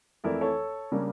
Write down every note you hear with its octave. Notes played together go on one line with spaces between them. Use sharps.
F2 E3 A3 E4 A#4 D5
A4 C#5
C#3 G3 A#3 D4